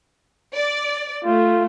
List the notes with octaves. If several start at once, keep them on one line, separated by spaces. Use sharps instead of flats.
D5
A3 F4